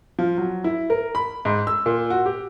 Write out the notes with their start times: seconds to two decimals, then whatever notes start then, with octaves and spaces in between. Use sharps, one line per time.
0.19 F3
0.38 F#3
0.64 E4
0.90 A#4
1.15 B5
1.45 G#2
1.67 E6
1.86 A#2
2.10 F#4
2.26 G4